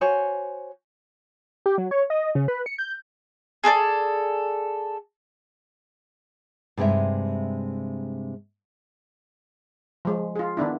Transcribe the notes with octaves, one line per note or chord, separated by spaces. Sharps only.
F#4 C5 C#5 G#5
G4
F#3
C#5
D#5
C#3
B4
C#7
G6
G#4 A4 B4 D5
G2 C3 G#3 D#4 E5
F3 G#3
F4 G#4
D#3 B3 D4 E4